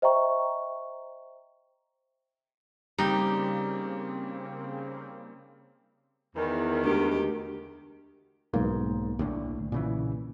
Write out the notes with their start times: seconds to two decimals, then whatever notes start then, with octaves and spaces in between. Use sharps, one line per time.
0.02 C5 D#5 E5 G5 A#5 C#6
2.98 C#3 G3 A#3 C4 D#4 G4
6.36 E2 D#3
6.84 D2 G#3 G4
8.54 B1 G#2 A#3
9.19 D2 A2 D3
9.72 A#2 C#3 E3